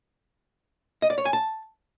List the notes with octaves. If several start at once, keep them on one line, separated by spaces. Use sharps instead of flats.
D#5
D5
C#5
G#5
A5